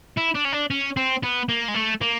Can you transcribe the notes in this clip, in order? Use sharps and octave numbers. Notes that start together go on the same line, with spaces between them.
E4
D4
C#4
D4
C#4
C4
B3
A#3
G#3
A3
A#3